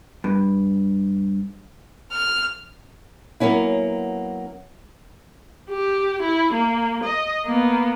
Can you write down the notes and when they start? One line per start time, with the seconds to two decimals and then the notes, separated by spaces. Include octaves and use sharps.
0.24 G2
2.12 F6
3.40 F#3 A#3 B3 C#4 E4
5.70 G4
6.23 E4
6.54 A#3
7.04 D#5
7.46 A#3 B3